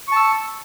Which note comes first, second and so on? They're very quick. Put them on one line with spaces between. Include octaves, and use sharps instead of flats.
C#6 A5 E6